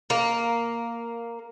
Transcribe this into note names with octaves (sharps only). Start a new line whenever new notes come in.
A#3